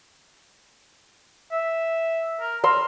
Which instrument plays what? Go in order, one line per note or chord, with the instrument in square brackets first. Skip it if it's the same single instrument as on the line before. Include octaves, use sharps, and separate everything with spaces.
[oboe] E5
A#4
[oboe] A#4 [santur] C6 E6